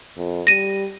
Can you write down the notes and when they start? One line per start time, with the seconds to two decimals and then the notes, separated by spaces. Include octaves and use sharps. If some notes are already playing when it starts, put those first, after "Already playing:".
0.17 F2
0.47 G3 A#6 D#7